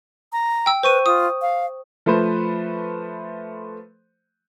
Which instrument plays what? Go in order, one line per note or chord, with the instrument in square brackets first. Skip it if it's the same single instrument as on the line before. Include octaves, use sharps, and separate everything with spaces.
[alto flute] A#5
[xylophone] G5 E6
[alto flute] B4 [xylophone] C5 C#6 D#7
[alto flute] F4 [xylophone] D#6
[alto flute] F5
[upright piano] F3 A3 B4 C5